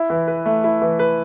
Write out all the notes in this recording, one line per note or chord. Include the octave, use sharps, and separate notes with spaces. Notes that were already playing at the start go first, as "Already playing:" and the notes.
Already playing: E4
E3
B4
A3
E4
E3
B4